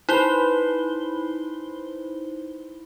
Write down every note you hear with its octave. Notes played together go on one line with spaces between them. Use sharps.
D#4 E4 B4 C5 G7